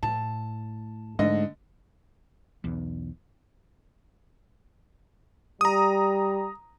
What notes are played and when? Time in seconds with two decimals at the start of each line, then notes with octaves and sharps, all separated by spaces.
0.03 A2 A5
1.19 G#2 D3 A3 D#5
2.64 B1 E2
5.61 G3 A#5 D#6